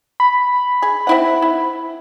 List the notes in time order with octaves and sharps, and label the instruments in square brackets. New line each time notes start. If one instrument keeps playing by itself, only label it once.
[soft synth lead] B5
[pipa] G#4
C4 E4 F#5
E4